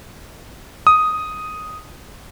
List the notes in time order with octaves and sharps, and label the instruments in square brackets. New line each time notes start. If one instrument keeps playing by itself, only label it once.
[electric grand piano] D#6